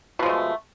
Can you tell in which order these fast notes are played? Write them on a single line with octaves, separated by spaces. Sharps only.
B2 F3 G#3 A3